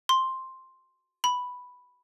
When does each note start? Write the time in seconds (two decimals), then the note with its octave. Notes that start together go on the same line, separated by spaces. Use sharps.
0.09 C6
1.24 B5